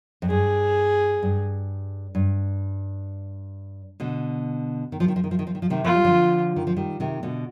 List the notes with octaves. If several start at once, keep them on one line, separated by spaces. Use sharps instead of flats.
F2
G2 G#4
G2
G2
B2 D3
D#3
F3
D#3
F3
D#3
F3
D#3
F3
D#3
F3
C3 D#3
F3 F4
G3
D3 F3
D#3
F3
D#3 G3
C3 D#3
B2 D3